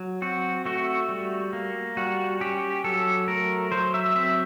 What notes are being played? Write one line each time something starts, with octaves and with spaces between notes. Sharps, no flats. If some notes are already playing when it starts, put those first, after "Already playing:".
Already playing: F#3
C4 F#4
A3 F#4
G3
A#3
G3 F#4
C#4 G4
F#3 A4
A3 A#4
F#3 C5
E5
C4 E5